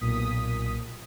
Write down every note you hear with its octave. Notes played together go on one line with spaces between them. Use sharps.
B1 A#2 D#6 B6